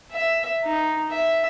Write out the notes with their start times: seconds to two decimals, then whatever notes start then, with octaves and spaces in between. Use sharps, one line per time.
0.12 E5
0.65 D#4
1.11 E5